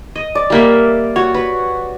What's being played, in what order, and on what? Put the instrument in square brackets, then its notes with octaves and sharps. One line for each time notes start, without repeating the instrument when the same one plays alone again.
[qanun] D#5
[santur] D5
[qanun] G3 A#3 E5
[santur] F#4 [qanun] C#5
[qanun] B4